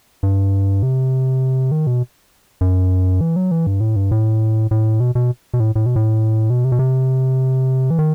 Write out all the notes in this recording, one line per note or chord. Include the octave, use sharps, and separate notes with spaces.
G2
C3
D#3
B2
F#2
E3
F#3
E3
G2
A2
G2
A2
A2
B2
B2
B2
A2
A2
B2
A2
B2
C3
B2
C3
E3
D#3